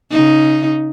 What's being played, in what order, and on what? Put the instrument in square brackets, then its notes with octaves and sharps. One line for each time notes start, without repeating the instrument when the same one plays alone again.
[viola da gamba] C#3 D#4